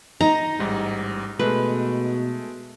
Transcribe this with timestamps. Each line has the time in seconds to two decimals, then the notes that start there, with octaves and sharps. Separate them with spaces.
0.21 D#4 A#5
0.59 A1 G#2 G3
1.39 B2 G#3 A3 B4